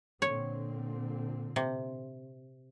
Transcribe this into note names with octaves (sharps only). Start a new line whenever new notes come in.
A#2 D3 C4 C#5
C3